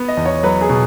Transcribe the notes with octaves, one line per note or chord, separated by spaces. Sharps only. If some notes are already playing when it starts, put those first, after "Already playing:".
Already playing: B3
D#5
E2
C#5
F#3 B4
G#4
B2